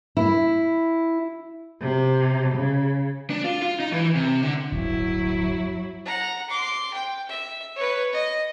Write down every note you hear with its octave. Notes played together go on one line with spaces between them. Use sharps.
E4
C3
C#3
D4
F4
F4
D#4
E3
C3
D3
D1 G1 F#3 E4
F#5 A#5
C6 D6
G5
E5
B4 C#5
D#5